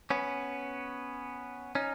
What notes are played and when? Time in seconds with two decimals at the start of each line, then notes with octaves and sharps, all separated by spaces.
0.10 B3 C#4
1.75 C#4 D#4